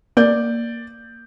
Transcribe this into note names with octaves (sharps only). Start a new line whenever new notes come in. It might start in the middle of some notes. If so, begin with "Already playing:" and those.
A#3 D5 G6